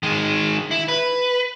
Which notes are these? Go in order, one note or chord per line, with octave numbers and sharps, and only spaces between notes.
D#3 G#3
E4
B4